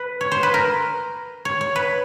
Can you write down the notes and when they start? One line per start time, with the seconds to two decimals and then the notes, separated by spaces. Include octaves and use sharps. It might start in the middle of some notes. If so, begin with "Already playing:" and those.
Already playing: B4
0.21 C#5
0.32 C5
0.43 B4
0.54 A#4
1.45 C#5
1.61 C#5
1.76 B4